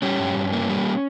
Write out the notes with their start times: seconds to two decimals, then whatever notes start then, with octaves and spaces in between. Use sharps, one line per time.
0.02 G3 C#4
0.19 G2
0.36 G2
0.53 A#3
0.69 G3